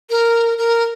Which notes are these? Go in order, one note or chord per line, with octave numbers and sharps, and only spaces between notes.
A#4
A#4